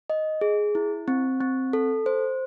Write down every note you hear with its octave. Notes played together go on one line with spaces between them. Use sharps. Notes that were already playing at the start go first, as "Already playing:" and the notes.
D#5
G#4
E4
C4
C4
A4
C5